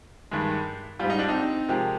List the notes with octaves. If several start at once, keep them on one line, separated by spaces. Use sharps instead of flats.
G2 D#3 G#3
G#2 G3 F4
D#4
D4
C4 D#4
C3 F3 G#3 G4 A#4